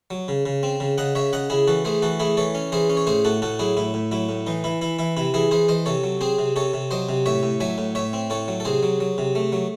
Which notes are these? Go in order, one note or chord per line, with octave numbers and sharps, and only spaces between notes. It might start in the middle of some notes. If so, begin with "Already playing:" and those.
F#3
C#3
C#3
C4
C#3
C#3 D#5 F#5
C#3 C#5 E5
C#3 D#5 F#5
C#3 E4 G#4
E3 F#4 A4
A3 G#4 C5
E3 F#4 A4
A3 E4 G#4
E3 A4 C#5
C#4
E3 G#4 C5
C#4
C#5
A2 G#4 C5
A2 F#4 A4
A2 F#4 A4
F#3 E4 G#4
A2 E4
A2
F#3 E4
A2
E3 D#4
E3 E4
E3 E4
E3 E4
C3 E4
E3 E4 G#4
E3 G#4 C5
E3 C5 D#5
C3 A4 C#5
F#3
C4 G#4 C5
C3
C3 A4 C#5
C3
F#3 C5 D#5
C3
A2 C#5 E5
A2
F#3 E5 G#5
A2
A2 C#5 E5
C4
A2 A4 C#5
F#3
A4
C3 G#4 C5
F#3
F#3
C3
A3
F#3